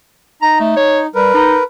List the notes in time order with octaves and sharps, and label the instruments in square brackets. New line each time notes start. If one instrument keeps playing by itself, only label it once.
[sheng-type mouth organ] D#4 [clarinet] A#5
[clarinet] A3
C#5
[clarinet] G3 [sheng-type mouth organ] A#4 B4
[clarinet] D#4